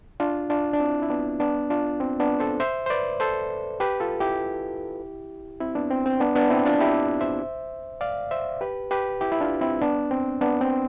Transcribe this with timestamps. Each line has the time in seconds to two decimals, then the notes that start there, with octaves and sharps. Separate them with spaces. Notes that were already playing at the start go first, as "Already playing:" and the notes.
0.20 D4 F4
0.50 D4 F4
0.73 D4
0.80 C4 E4
1.02 E4
1.10 B3 D4
1.40 B3 D4
1.70 D4 F4
2.00 C4
2.20 B3 D4
2.40 A4 C5
2.60 C5 E5
2.86 C5
2.90 B4 D5
3.20 A4 C5
3.80 G4 B4
4.00 F4 A4
4.20 E4 G4
5.60 C4 E4
5.75 B3 D4
5.91 C4
6.06 C4
6.20 B3 D4
6.35 B3 D4
6.50 C4 E4
6.66 D4 F4
6.81 E4 G4
7.21 C5 E5
8.01 D5 F5
8.31 C5 E5
8.61 G4 B4
8.91 G4 B4
9.21 E4 G4
9.32 E4
9.41 D4 F4
9.61 C4 E4
9.81 B3 D4
10.11 C4
10.41 B3 D4
10.61 C4